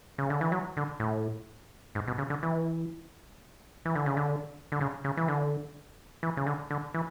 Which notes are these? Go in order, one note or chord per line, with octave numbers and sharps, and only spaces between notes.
C#3
D3
E3
F#3
D3
A2
G#2
B2
C#3
D3
E3
E3
D3
C#3
D3
D3
C#3
C#3
E3
D3
E3
C#3
D3
D3
E3